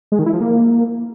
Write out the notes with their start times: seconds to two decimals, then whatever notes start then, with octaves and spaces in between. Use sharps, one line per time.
0.12 G#3
0.19 D#3
0.26 E4
0.33 F3
0.41 A#3